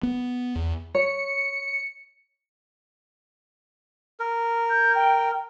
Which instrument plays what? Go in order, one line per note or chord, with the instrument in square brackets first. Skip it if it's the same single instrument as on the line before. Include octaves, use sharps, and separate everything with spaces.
[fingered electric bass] B3
E2
[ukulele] C#5 [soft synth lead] C#7
[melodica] A#4
[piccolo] G6
G5